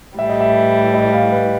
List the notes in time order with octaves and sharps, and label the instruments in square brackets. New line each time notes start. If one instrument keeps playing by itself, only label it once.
[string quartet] A2 E3 G3 [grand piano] E5
[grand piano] D#5
E5
D#5
F5
B4